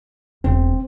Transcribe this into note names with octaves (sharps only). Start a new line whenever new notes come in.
E1 C4